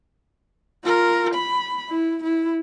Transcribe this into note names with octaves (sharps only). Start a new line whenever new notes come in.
F4 A#4
B5
E4
E4